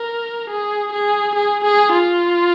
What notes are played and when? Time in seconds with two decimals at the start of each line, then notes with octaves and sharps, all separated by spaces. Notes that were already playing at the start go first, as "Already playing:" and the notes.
Already playing: A#4
0.50 G#4
0.93 G#4
1.35 G#4
1.64 G#4
1.93 F4